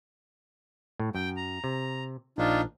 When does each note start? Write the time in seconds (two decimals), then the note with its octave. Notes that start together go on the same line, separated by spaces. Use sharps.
1.00 A2
1.15 F#2 G5
1.36 A#5
1.64 C3
2.38 A#1 D4 D#4 F4